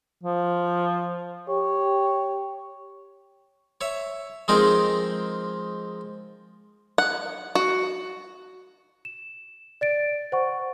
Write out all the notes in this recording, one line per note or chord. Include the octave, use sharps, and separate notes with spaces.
F3
G4 C#5
C#5 E5
F3 G#3 C4 D#4 G#4 A#4
F#5
F#4
E7
D5 A6 D7
C5 F#5 C#6